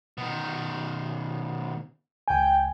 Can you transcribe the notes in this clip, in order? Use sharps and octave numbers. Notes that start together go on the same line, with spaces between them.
B2 D#3
C#2 G5 G#5